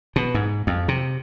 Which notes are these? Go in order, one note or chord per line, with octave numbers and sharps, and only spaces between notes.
B2
G#2
F2
C3